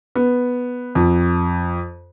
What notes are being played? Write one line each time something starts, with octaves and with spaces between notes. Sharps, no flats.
B3
F2